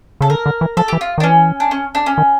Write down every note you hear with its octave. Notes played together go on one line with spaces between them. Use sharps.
C#3 A4
D3 A#4
D3
E3
F3 A4
E3 G4
F4
D#3
D4
E3 C#4
D4
C#4
D4
C#4
D#3